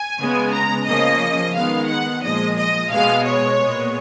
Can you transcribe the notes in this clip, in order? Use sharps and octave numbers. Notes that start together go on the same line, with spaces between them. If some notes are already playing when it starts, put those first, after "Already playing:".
Already playing: G#5
C#3 G#3 B3
A#5
C#3 F3 A#3 D#5
D#3 G#3 B3 F5
F#5
A#2 F3 G#3 D#5
D#5
B2 G#3 B3 F5
C#5
A#2 G#3 B3